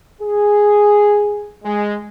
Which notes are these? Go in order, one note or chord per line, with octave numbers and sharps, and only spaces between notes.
G#4
G#3